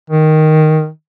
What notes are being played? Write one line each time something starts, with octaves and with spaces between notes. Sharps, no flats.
D#3